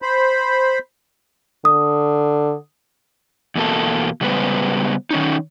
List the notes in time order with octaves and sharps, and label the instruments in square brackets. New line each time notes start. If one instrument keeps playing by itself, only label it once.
[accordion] C5 B5
[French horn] D3 [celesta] D#6
[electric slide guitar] E2 B2 A#3 A4
C#3 G3 G#3 B3 B4 C5
D#3 C#4 D#4